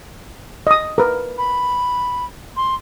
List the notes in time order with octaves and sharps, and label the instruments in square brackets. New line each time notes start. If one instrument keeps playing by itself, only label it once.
[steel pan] D#5 D#6
A#4 B4
[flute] B5
C6